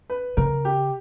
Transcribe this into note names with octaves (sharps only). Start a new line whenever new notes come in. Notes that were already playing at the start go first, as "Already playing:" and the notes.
B4
C#3 A#4
G4